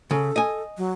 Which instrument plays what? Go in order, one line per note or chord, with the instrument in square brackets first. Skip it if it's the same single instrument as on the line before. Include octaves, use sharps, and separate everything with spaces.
[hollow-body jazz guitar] C#3 [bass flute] A4
[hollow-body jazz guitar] D#5 G#5
[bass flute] F#3